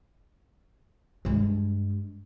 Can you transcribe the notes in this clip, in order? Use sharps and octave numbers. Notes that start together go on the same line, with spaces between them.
G2 G#3